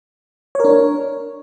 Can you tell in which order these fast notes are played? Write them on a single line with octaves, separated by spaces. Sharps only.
C#5 A#4 D4